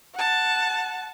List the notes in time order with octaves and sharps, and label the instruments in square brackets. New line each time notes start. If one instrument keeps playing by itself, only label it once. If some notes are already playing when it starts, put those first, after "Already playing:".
[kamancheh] F#5 A5